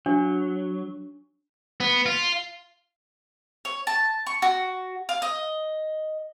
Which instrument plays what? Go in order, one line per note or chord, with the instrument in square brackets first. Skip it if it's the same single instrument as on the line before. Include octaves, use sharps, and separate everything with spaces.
[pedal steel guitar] F#3 [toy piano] D4
[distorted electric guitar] B3
F4
[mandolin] C#5
A5
C#6
F#4
F5
D#5